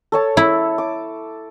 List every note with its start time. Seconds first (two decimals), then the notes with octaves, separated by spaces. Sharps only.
0.12 A4 C#5 A5
0.37 E4
0.78 D6